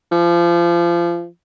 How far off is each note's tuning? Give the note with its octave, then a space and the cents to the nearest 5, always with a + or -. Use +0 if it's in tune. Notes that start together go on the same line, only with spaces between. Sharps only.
F3 -25